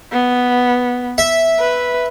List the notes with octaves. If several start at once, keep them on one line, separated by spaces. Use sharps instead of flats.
B3
E5
B4